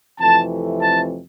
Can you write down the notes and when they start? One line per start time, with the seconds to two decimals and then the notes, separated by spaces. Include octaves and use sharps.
0.19 F2 C3 E3 A3 A5
0.82 A5